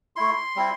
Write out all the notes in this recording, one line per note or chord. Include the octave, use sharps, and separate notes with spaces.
A3 E4 C6
G3 C4 E4